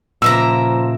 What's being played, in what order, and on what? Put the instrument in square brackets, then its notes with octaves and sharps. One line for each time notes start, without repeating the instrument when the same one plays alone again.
[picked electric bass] A#2 C#3 [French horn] F3 [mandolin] A#3 E5 A#5 [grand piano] E6